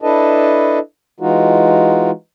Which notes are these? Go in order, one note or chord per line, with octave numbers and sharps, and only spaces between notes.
D4 E4 A4 B4 D#5 A5
E3 G#3 D#4 F4 F#4